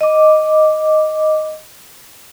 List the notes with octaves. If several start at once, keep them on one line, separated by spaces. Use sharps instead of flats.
D#5 D6